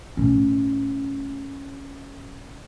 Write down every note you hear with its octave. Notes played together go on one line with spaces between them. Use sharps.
A2 C#4